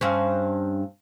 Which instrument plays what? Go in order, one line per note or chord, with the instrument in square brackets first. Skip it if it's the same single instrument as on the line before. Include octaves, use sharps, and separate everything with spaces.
[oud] G2 C4 C#4